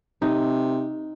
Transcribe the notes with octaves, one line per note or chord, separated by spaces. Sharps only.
C3 D#4